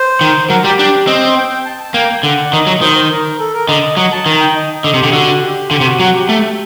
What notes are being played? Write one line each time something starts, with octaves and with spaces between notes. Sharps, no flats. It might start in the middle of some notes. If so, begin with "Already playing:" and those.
Already playing: C5
D#3
F#3 A#4
G3 G4
D4 G4
C4 D#5
G5
G5
A5
A5
A#3 G5
D3 F#5
D5
D#3 D#5
F#3
D#3 C5
C5
A#4
A4
A#4
D3 D#5
F#3 D#5
A5
D#3 A#5
G5
D#5
D3 D#5
C3
D3 G4
D3 F#4
G4
D3 G4
C3
F#4
F#3 F#4
G4
A3